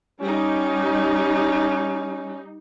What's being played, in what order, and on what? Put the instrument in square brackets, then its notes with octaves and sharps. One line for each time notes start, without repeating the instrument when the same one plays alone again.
[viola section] G3 D#4 [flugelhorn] C#4